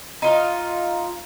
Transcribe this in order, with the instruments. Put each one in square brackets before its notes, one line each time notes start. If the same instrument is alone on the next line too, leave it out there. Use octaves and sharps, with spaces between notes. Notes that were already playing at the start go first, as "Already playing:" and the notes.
[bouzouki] D#4 F4